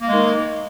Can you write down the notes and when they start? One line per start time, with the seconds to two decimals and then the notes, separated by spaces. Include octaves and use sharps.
0.02 A#3
0.07 G#3
0.12 D#3